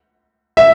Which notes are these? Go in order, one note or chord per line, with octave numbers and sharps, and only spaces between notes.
E5